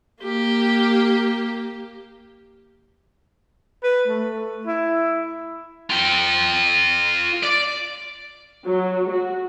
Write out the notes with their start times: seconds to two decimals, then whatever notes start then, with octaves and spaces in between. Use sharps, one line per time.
0.23 A#3 G4
3.84 B4
4.08 A3
4.67 E4
5.90 F4 G5
7.43 D5
8.65 F#3
9.10 F#4